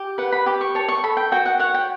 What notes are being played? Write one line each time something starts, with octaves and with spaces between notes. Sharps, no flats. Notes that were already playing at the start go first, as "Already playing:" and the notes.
Already playing: G4
B4 F#5
B5
G4 D6
C#6
C#5 A5
C#6
A4 B5
G5
F#4 G5
F#5
C#5 F#5
G5